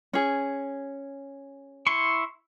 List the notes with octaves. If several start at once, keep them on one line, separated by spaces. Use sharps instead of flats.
C#4 G#4
E4 C6 C#6